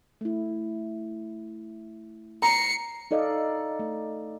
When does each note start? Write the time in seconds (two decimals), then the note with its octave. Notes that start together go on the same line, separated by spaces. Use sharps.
0.21 A3 E4
2.42 A#5 C7 C#7
3.11 D#4 A4 D5 D#5 F5
3.79 A3